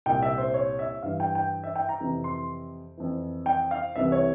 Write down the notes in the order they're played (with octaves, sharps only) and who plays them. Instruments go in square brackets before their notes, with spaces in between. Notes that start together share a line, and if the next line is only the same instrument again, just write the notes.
[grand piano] C2 A#2 G5
E5
C5
C#5
E5
G2 E3 F5
G5
G5
E5
G5
A#5
F2 C3 E3
C6
F2 E3
G5
F5
C2 C3 E3 E5
C#5